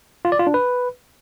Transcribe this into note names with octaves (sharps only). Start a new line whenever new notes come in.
F4
D5
F4
D4
B4